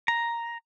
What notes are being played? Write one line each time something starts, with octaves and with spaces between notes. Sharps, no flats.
A#5